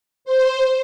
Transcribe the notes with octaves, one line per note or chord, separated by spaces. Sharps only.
C5